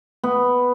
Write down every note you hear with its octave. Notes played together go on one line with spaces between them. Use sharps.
B3